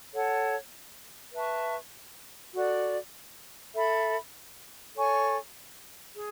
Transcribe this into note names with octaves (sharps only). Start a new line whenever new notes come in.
A4 C#5 F#5
B4 E5 A5 C#6
F#4 A4 D5
A4 E5 B5
A4 C#5 G#5 C#6
G#4